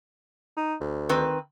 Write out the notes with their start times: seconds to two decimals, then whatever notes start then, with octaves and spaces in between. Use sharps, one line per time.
0.57 D#4
0.81 D2
1.09 D#3 C4 B4